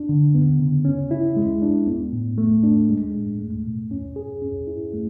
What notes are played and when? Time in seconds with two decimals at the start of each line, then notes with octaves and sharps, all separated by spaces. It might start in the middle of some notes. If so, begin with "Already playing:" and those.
Already playing: D4
0.09 D3
0.35 B3
0.60 C#3
0.85 C#4
1.11 E4
1.36 G#3
1.62 D4
1.87 B3
2.13 A2
2.38 A3
2.63 D4
2.89 G#3
3.14 A2
3.40 A3
3.65 B2
3.91 C#4
4.16 G#4
4.42 C#4
4.67 E4
4.93 A3